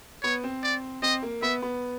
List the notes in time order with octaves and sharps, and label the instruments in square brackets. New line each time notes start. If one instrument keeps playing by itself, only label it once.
[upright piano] B3 [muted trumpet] C#5
[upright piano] C4
[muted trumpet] D5
[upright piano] C4 [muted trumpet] D#5
[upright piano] A#3
[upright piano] B3 [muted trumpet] E5
[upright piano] B3